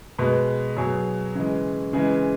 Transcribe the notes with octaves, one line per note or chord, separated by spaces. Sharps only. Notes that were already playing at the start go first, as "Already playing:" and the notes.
B2 G#3 B4
B2 F#3 G#4
C#3 E3 G#3
C#3 E3 G#3 G#4